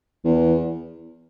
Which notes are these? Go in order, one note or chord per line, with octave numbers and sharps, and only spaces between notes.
E2